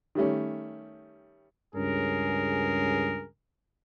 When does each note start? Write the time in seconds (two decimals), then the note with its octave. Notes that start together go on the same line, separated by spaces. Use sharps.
0.15 D#3 G3 A3 C#4
1.75 C#2 G2 C#4 G#4 A#4